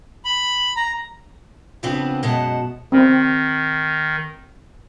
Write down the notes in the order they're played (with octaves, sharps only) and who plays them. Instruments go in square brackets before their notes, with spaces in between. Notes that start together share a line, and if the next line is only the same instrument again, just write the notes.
[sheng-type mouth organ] B5
A#5
[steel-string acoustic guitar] C#3 F3 B3 C4 D4 B4
F#2 B2 G#3 F#5 A5
[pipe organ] D#3 [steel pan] C4